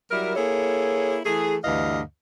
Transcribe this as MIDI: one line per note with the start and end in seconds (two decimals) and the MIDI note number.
0.11 0.36 54
0.11 0.36 55
0.11 0.36 64
0.11 0.36 70
0.36 1.17 58
0.36 1.17 64
0.36 1.17 68
0.36 1.17 69
0.36 1.17 73
1.26 1.56 52
1.26 1.56 57
1.26 1.56 68
1.64 2.00 38
1.64 2.00 43
1.64 2.00 52
1.64 2.00 75
1.64 2.00 77